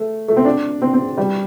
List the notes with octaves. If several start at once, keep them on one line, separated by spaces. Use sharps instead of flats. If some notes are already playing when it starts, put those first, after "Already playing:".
Already playing: A3
A3
C4
D4
C4
C4
G3